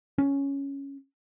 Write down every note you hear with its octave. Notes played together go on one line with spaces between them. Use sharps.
C#4